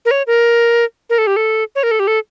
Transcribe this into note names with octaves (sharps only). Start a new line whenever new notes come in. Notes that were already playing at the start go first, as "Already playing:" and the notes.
A#4
C#5
A#4
A#4
A4
G4
A4
C#5
A#4
A4
G4
A4